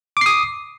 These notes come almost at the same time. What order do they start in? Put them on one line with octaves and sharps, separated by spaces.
D6 C7 D#6